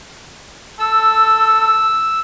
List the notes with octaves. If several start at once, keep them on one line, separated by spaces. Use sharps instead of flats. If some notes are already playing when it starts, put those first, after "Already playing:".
A4 E6